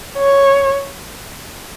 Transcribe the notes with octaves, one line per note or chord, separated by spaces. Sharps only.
C#5